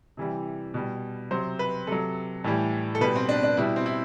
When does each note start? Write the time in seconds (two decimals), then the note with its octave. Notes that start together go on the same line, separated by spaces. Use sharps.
0.17 C3 E3 G3
0.74 B2 G3
1.31 C3 F#3 C5
1.59 B4
1.87 C3 F#3 A4
2.44 A2 E3 G3
2.95 A4
3.01 B2 G3 B4
3.15 C4
3.29 D4
3.43 D4
3.57 B2 G3 E4
3.76 C4
3.86 E4